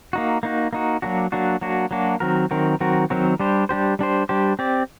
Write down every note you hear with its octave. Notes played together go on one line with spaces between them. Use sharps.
A#3 D#4 F#4
A#3 D#4 F#4
A#3 D#4 F#4
F#3 A#3 D4 F#4
F#3 A#3 D4 F#4
F#3 A#3 D4 F#4
F#3 A#3 D4 F#4
D#3 F#3 C4 F#4 A#4
D#3 F#3 C4 F#4 A#4
D#3 F#3 C4 F#4 A#4
D#3 F#3 C4 F#4 A#4
G3 D4 G4 C5
G3 D4 G4 C5
G3 D4 G4 C5
G3 D4 G4 C5
C4 G4 D5